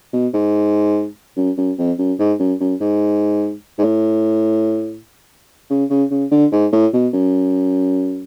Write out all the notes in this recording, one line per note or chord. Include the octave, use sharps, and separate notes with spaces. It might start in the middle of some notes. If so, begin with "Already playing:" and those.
B2
G#2
F#2
F#2
F2
F#2
G#2
F#2
F#2
G#2
G#2
A2
C#3
C#3
C#3
D3
G#2
A2
B2
F#2